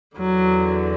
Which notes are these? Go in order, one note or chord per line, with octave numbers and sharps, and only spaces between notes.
E2 D3 F#3